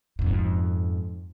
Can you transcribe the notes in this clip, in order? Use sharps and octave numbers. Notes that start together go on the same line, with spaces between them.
F2 G#2